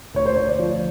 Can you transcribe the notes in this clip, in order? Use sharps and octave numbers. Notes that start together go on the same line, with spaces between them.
D2 C#5
C5
D2 C#5
D5
F3